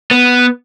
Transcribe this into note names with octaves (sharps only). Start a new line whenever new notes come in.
B3